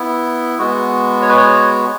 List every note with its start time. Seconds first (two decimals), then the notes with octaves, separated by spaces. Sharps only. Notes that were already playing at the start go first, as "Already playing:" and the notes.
Already playing: B3 E4
0.59 G#3 B3 F#4
1.22 C#5
1.29 B4
1.37 C#5